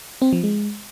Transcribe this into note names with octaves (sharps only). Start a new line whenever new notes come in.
C4
F3
G#3